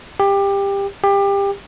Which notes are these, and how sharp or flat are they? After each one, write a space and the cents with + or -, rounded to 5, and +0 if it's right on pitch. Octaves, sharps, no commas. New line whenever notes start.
G4 +20
G4 +25